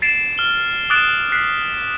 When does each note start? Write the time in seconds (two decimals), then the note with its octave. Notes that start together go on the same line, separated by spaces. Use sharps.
0.02 A6 C7 D7 E7
0.38 F6 G7
0.90 D6 D#6 F#6 A6 D7 E7
1.32 F#6 B6 C7